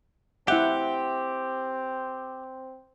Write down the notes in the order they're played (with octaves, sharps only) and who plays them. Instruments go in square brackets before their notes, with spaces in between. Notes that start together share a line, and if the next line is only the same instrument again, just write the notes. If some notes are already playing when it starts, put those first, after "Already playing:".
[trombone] C4 [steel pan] E4 E5 F#5 [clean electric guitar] G4